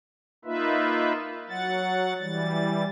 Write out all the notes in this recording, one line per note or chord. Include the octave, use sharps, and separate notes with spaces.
A#3 D#4 F4 B4 E5
F#3 F#5 A6
E3 G3 A6